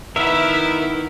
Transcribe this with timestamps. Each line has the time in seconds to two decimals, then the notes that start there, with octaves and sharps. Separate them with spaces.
0.16 D#3 B3 E4 A#4 B4 E5